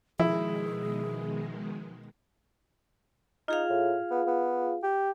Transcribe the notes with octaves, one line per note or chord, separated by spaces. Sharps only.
B2 D#3 F3 G#3 E4 G#4
D#4 F4 G#4 F5
A2
B3
B3
G4